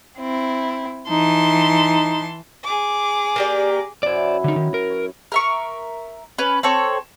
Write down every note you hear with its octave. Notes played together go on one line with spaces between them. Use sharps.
C4 E4
E3 D#4 A5 C6
G#4 D6
A#3 G4 D5
F#2 E4 C5 D5
D3 D#4
D#3
A#4
C#5
A#4 E5 C#6
C#4 B4
C4 A4 C#5